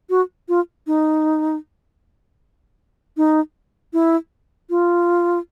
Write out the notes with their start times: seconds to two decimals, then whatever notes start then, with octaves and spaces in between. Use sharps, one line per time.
0.10 F#4
0.49 F4
0.87 D#4
3.17 D#4
3.93 E4
4.70 F4